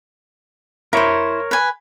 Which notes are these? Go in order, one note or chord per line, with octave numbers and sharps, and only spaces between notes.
E4 A#4 C5 C#5
B4 G#5